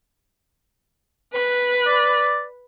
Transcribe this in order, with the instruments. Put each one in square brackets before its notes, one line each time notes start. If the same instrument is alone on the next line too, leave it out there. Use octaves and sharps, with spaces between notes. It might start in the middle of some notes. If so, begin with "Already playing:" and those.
[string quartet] B4 F#6
[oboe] D5